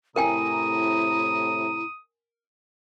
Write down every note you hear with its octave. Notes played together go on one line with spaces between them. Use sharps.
A2 C3 E4 A#4 G5 G#5 A#5 D#6